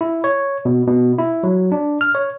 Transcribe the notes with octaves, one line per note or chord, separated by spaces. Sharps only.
E4
C#5
B2
B2
E4
F#3
D4
F6
C#5